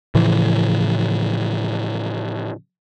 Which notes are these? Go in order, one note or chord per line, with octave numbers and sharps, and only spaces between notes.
A2 C#3 E3 F3